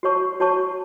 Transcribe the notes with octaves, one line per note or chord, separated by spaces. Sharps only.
F#4 C#5 A5 C#6
F#4 C#5 A5 C#6